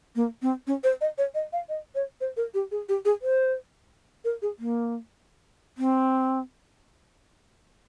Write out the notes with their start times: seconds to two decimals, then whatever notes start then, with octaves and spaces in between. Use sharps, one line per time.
0.16 A#3
0.42 C4
0.67 C#4
0.84 C5
1.01 D#5
1.18 C#5
1.35 D#5
1.53 F5
1.69 D#5
1.95 C#5
2.21 C5
2.37 A#4
2.54 G4
2.71 G#4
2.89 G4
3.05 G#4
3.22 C5
4.25 A#4
4.42 G#4
4.59 A#3
5.78 C4